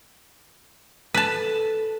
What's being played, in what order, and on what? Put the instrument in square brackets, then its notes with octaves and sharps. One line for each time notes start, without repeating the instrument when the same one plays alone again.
[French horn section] A4 [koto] B4 A5